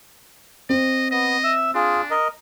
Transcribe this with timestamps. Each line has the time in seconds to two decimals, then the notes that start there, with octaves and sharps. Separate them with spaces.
0.70 C4 D#5
1.11 B3 D#5
1.44 E5 E6
1.75 D4 F4 G#4
2.11 A#4 D#5